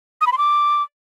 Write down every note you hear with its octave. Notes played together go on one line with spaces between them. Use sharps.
D#6
B5
C6
D6